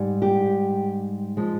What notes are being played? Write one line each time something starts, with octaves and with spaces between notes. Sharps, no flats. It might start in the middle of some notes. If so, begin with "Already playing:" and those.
Already playing: G#2 G3
G4
F3 G#3